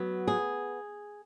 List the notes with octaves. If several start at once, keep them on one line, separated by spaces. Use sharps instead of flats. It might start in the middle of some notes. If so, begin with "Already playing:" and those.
Already playing: F#3 B3
G#4